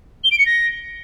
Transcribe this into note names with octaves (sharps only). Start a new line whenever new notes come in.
G7
D7
C#7
A#6